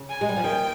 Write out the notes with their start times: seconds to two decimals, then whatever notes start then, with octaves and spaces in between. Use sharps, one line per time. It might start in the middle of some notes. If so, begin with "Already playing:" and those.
Already playing: C#3
0.09 G#5
0.21 G#3
0.29 G3
0.36 F3
0.44 D#2 D#3 G5